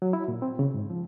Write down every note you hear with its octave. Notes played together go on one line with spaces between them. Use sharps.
F#3
E4
A#2
C4
C#3
G#2
F3